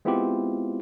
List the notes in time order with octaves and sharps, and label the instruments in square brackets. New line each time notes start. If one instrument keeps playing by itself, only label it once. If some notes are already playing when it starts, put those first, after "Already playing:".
[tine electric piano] G#3 B3 C4 E4 F4 G4